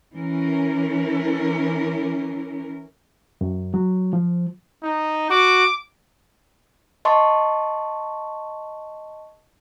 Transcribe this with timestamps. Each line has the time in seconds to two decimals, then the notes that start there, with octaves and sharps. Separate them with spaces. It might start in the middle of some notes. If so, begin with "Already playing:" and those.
0.14 E3 C#4 A#4
3.41 F#2
3.74 F#3
4.13 F3
4.83 D#4
5.30 F#4 D6
7.05 D#5 A5 C6 C#6